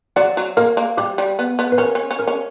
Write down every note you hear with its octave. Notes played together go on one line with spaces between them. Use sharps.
F#3 D5 F#5
F#3
A#3 A#4
A#3
G3 G4
G3
B3
B3
B4
C#4 A#4
C#4
C#4
A#4
C#4